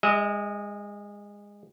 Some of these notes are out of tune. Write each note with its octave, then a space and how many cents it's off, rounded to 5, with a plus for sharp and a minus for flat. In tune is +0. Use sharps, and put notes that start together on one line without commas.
G#3 -25 D#5 +45